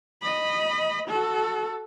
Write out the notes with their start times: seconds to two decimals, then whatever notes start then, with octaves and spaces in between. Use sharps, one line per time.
0.22 D#5 B5
1.08 F#4 A4